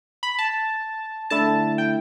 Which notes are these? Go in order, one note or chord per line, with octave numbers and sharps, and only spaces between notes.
B5
A5
D3 A3 E4 A5
G5